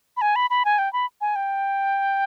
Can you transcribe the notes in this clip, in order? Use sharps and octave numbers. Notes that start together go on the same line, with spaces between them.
B5
G#5
B5
B5
G#5
G5
B5
G#5
G5